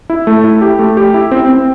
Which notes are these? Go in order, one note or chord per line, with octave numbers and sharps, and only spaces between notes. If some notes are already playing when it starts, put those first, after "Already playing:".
E4
A3
E4
G4
A3
G4
E4
C4
C4